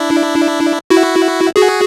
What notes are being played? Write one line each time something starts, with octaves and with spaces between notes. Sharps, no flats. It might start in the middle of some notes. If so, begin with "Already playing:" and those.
Already playing: D4 E4
E4 F#4
F#4 G#4